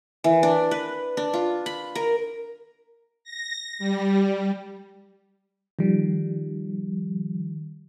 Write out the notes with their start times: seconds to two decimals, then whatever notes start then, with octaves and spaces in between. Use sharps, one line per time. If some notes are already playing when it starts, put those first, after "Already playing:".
0.24 E3
0.43 D4
0.71 B4
1.17 D4
1.34 F4
1.66 B5
1.95 A#4
3.24 A#6
3.79 G3
5.79 D#3 F3 G3